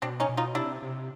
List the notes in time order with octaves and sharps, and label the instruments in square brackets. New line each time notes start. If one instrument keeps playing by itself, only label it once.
[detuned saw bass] B2 [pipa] C4 D4
[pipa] C#4 D#4
[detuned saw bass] B2
[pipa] D#4 F4
[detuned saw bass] C3 [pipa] D4 E4
[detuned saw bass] C3